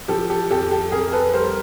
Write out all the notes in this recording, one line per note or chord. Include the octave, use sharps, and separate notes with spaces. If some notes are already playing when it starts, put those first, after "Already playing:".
F3 G4 A4
G4 A4
F2 G4 A4
G4 A4
F2 G#4 A#4
A4 B4
G3 A#4 C5